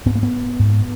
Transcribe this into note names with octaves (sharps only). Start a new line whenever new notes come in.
G#2 B3
A#3
B3
G#2